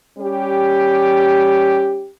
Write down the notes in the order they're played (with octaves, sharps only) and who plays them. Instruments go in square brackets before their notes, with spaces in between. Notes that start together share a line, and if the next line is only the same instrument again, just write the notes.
[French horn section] G3 C#4 G4